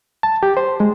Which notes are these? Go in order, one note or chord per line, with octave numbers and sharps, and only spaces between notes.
A5
G4
C5
G#3